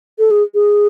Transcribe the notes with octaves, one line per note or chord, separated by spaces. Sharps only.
A4
G#4
G#4